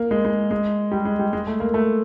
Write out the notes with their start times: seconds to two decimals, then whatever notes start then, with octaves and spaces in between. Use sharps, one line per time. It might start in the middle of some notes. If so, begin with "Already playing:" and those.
Already playing: A#3
0.11 G#3
0.25 G#3
0.51 G#3
0.92 G3
1.05 G#3
1.19 G3
1.33 G#3
1.47 A3
1.60 A#3
1.74 A3